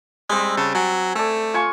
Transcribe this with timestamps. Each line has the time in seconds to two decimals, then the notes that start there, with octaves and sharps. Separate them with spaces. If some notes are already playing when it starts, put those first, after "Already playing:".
0.29 G3 G#3 C4
0.57 C#3 A5
0.75 F#3 G#5
1.15 A3 A4 D5
1.54 F4 G#5 C#6